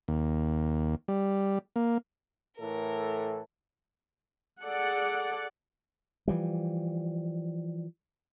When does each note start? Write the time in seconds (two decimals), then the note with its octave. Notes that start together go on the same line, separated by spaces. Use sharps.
0.08 D#2
1.08 G3
1.76 A#3
2.60 A2 E3 A4 A#4
4.63 G#4 A4 D5 F#5
6.28 E3 F3 G3